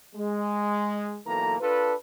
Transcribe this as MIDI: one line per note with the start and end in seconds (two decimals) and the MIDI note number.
0.16 1.18 56
1.26 1.56 35
1.26 1.56 52
1.26 1.56 58
1.26 1.56 69
1.26 1.56 82
1.61 1.94 62
1.61 1.94 65
1.61 1.94 69
1.61 1.94 71